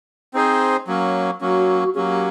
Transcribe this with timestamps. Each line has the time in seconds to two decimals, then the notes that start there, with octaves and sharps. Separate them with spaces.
0.34 C4 D#4 G#4 C5
0.87 F#3 A#3 C#4
1.41 F#3 A#3 C#4 F#4
1.94 F#3 A#3 C#4 G4 G#4